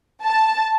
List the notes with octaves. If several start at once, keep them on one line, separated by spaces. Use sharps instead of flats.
A5